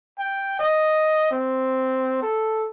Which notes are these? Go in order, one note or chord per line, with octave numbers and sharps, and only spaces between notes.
G5
D#5
C4
A4